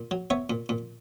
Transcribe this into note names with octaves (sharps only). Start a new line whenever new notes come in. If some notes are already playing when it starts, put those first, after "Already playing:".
Already playing: A#2
F#3
B3 C#5 E5
A#2
A#2